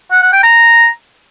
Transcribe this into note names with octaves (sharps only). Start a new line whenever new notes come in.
F#5
F#5
G5
A#5